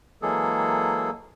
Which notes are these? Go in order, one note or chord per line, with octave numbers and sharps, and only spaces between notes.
E3 F#3 G#3 A#3 G#4 A4